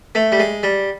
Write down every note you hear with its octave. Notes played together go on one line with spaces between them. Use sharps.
A3
G3
G#3
G3